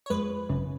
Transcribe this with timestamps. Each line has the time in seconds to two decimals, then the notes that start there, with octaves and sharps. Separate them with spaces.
0.06 C#5
0.10 F2 F3 G#3 B4
0.49 G#1 F#2 C#3